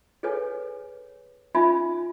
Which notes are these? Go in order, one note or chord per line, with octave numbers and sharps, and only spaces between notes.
G#4 A4 B4 C#5 G#5
C#4 D#4 F4 E5 G#5 B5